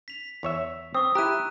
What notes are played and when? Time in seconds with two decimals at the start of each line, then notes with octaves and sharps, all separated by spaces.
0.08 B6 F7
0.43 E2 C#5 E5
0.94 C4 C#6 D#6 E6
1.15 E4 G4 A#5 F#6 D#7